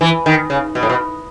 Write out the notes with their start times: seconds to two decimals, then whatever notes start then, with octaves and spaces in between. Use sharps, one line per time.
0.01 E3
0.26 D#3
0.50 C#3
0.75 B2
0.83 A2
0.89 B2